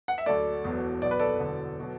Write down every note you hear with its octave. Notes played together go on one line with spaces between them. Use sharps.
F#5
E5
D2 D3 F#3 A4 D5
E1 E2 B2 F#3
B1 B2 F#3 D5
B4
A4 D5
E1 E2 D3 F#3
B2 F#3